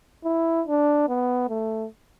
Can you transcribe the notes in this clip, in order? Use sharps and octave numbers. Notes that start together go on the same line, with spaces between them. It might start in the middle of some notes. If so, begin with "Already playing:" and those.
E4
D4
B3
A3